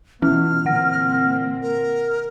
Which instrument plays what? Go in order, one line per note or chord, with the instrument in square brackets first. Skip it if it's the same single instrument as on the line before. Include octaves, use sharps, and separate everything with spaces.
[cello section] B2 [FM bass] E3 [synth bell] C#4 [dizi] F6
[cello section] A#2 C4 [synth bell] D3 F#5 A#6
[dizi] A#4